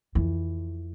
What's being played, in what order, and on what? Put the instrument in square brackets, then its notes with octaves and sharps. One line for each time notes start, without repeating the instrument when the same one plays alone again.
[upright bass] F2 E3